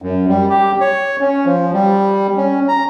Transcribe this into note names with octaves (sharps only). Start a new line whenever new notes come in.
F#2
G3
G4
C#5
C#4
F3
G3
C#4
A#5